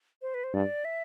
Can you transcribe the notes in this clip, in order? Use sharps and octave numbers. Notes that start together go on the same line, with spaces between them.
C5
B4
C5
G2 D5
E5